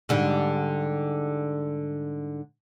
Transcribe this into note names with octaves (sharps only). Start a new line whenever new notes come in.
G#2 D3 G3